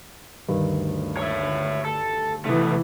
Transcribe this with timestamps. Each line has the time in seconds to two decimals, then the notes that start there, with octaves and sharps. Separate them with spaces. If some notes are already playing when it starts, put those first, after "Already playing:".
0.49 D2 G2 D#3
1.17 C#5 E5
1.85 A4
2.45 C3 E3 A3 B3